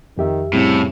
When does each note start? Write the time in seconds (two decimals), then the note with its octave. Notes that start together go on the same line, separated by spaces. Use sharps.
0.18 F2 D#3 G4 E5
0.53 C2 A2 C#3